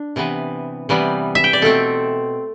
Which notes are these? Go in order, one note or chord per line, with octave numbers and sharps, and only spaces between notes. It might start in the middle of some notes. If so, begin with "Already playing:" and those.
Already playing: D4
C3 E3 B3
C3 E3 G3 B3
E5
G5
D5
B2 A3 C4 A4